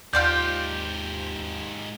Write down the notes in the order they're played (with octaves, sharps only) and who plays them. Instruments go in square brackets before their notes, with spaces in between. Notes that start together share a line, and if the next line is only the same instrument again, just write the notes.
[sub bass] D#2 [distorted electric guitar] G#2 G4 [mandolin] F4 C5 D5 [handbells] G6